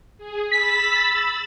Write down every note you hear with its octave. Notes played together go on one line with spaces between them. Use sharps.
G#4
B5 E6 A6 B6